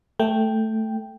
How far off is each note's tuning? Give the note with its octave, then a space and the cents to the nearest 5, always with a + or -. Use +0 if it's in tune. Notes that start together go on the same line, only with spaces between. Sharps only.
A3 +0 G5 +0